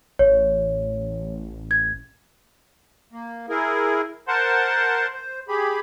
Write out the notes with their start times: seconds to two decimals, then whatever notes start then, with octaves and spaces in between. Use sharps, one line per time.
0.19 A1 C#5
1.71 G#6
3.12 A#3
3.49 E4 G#4 A#4
4.28 A#4 C5 F#5 A5 C6
5.13 C5
5.48 G4 G#4 B5